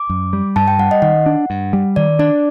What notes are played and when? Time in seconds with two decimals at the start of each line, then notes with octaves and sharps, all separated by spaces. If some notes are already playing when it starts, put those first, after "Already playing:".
Already playing: D6
0.09 F#2
0.33 G3
0.56 G2 A5
0.68 G5
0.79 G3 F#5
0.91 D#5
1.02 D#3 F#5
1.26 D4
1.50 G2
1.73 G3
1.96 D#3 D5
2.19 D4 D5